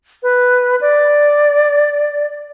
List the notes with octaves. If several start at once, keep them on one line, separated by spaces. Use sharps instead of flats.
B4
D5